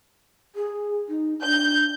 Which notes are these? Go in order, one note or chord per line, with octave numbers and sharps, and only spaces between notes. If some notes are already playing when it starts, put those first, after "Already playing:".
G#4
D#4
D4 G6